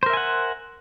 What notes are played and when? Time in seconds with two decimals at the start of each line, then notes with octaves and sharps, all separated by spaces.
0.03 C5
0.06 A#4
0.10 E5
0.13 G#5
0.17 F#5